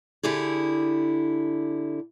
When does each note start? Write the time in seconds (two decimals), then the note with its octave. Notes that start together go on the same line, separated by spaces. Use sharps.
0.23 D3 E4 G4 G#4